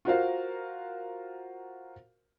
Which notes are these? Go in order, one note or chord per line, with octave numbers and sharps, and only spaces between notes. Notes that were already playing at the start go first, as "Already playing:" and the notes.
F4 F#4 A#4 C5 F5